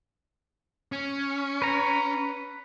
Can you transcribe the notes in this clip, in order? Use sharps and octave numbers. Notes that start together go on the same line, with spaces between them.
C#4
B4 A#5